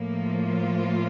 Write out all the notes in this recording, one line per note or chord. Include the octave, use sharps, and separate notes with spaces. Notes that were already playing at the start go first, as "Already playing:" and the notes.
Already playing: A2 F3 A#3
F4